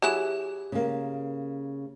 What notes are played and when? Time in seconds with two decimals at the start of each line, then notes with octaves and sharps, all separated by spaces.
0.02 F#3 E4 G4 G#4 F#6 E7
0.72 C#3 A#3